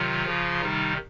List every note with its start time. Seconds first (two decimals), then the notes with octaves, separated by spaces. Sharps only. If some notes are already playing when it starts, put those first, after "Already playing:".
Already playing: C3 D#3 F#3 F4
0.26 C#3 F3
0.62 C3 D#3 G3 D#4